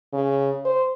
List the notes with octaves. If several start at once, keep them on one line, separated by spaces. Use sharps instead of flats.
C#3
C5